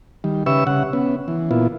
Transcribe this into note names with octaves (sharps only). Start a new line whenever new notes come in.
D#3 G3
C#3 G4 B4 E5 C#6 E6
C#3 F#5
B3 C#4
E3
A#2 B3 E4 F4